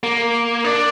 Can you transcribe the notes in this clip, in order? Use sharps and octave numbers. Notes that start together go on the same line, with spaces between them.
A#3
D4